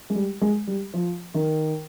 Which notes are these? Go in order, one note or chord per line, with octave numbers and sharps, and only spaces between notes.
G#3
G3
G#3
G3
F3
D#3